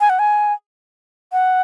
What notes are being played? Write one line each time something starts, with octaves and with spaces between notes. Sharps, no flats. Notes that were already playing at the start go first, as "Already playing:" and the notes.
G#5
F#5
G#5
F#5